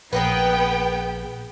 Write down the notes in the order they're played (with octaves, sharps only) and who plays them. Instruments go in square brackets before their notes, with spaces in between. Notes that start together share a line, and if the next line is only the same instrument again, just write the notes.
[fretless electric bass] A#1 [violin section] B3 G5 [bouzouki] G#4 A#4 B4